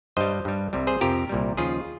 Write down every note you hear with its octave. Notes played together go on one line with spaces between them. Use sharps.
G2 G3 C5 D#5
G2 G3
C2 C3 G3
G#4 C5
F2 C3 F3 G4 A#4
C2 A#2 G3
D#2 C#3 F3 F4 G#4